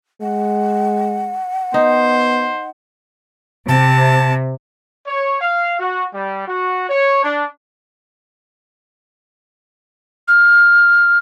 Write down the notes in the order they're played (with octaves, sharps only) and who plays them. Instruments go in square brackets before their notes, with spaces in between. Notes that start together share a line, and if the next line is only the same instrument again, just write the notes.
[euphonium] G#3 [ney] F#5
[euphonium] B3 [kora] D#4 [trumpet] C5
[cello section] C3 [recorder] A5
[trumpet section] C#5
F5
F#4
G3
F#4
C#5
D4
[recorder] F6